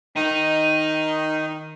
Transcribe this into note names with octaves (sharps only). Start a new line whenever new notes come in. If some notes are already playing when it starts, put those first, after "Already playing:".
D#3 D#4